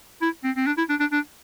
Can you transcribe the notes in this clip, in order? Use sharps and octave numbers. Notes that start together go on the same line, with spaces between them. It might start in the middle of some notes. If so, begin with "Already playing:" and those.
E4
C4
C4
D4
E4
D4
D4
D4